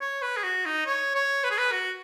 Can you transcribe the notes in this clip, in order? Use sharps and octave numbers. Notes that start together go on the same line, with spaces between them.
C#5
B4
G#4
F#4
D#4
C#5
C#5
B4
G#4
B4
F#4